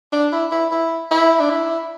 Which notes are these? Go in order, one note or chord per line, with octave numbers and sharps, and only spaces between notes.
D4
E4
E4
E4
E4
D4
E4